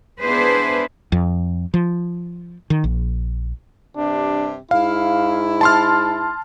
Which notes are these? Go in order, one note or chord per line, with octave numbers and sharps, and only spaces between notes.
B3 D4 E4 G#4 B4 C5
F2
F3
D#3
A#1
G2 C3 D4
G#2 E4 F5
A5 C6 F6